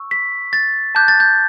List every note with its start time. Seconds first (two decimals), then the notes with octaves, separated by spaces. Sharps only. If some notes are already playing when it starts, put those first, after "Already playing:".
Already playing: C#6 E6
0.11 B6
0.53 A6
0.95 A5 D6 F#6 G6
1.08 A6
1.20 G6